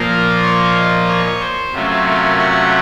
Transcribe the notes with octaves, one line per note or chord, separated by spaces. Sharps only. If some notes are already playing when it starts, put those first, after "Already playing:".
Already playing: A#2 F3 A#3 F4 A#4
C#5
D#5
C#5
C5
C3 F#3 A3 C#4 F4
A#4
F#5